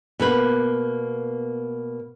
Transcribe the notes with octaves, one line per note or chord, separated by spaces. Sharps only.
B2 A#3 B4